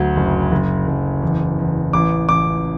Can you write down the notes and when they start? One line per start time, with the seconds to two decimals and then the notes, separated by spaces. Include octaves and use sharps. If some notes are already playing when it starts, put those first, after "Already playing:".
Already playing: D2 F#3
0.16 F#1
0.52 F#1
0.87 F#1
1.22 E2
1.59 E2
1.93 A1 D6
2.29 A1 D6